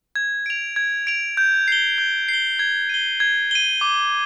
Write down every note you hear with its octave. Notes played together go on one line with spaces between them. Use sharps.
G#6
D7 F7
G#6
D7 F7
G6
C7 G7
G6
C7 G7
G#6
D#7 G7
G#6
D#7 G7
D6